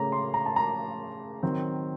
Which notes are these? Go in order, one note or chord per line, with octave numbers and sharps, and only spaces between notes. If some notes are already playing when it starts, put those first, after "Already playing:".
Already playing: C#3 A3 C#4 A#5
C6
A#5
A5
A#5
D#3 F#3 C4